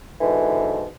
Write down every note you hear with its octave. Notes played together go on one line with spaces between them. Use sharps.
G#2 B2 D3 E3